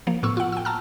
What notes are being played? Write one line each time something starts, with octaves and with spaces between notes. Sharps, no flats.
F3 A#3
A2 B3 C#6 E6
F4 F#5
G5 E6
A5 A#5 E6 F6